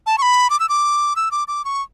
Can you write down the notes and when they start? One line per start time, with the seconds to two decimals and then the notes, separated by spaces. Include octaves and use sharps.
0.06 A5
0.18 C#6
0.22 B5
0.50 D6
0.60 E6
0.69 D6
1.16 E6
1.31 D6
1.48 D6
1.65 C#6